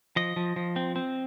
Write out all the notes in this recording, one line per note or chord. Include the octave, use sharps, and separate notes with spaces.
F3 D#5
F3
F3
C4
C4